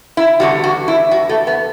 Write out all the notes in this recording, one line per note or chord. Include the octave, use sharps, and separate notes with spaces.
E4
E2 D3 G3 F#4
F#4
E4
F#4
A3
B3